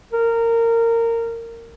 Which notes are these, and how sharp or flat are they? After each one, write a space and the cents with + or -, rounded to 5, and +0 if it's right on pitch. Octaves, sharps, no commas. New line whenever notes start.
A#4 -20